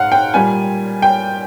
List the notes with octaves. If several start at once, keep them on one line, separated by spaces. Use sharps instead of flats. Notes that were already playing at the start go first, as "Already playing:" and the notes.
Already playing: G#2 F5 F#5
G5
A#2 G3 G#5
G5